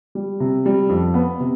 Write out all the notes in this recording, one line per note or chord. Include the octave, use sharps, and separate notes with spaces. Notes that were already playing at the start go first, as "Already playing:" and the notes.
G3
C3
G3
F2
B3
C3